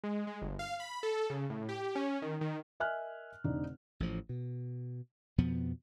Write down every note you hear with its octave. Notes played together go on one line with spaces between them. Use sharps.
G#3
G#3
G1
F5
B5
A4
C#3
A2
G4
C#4
D#3
D#3
A#4 D#5 E5 G#5 F6 F#6
F1 D3 D#4 D5
A1 A2 F3
B2
F2 B2 F3 B3